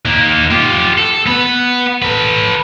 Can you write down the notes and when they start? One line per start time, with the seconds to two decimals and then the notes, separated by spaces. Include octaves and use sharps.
0.05 D#2 A#3
0.51 F4 G4
0.98 A4
1.26 B3 B4
2.02 A4 B4